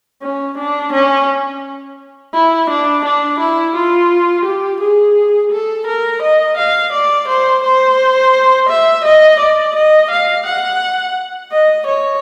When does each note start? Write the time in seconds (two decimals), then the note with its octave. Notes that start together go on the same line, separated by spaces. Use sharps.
0.22 C#4
0.58 D4
0.92 C#4
2.34 E4
2.70 D4
3.05 D4
3.39 E4
3.75 F4
4.45 G4
4.81 G#4
5.52 A4
5.87 A#4
6.23 D#5
6.58 F5
6.92 D5
7.28 C5
7.64 C5
8.69 E5
9.05 D#5
9.40 D5
9.75 D#5
10.11 F5
10.46 F#5
11.52 D#5
11.87 C#5